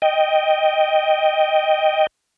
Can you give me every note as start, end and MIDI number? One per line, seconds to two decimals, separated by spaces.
0.02 2.07 75
0.02 2.07 79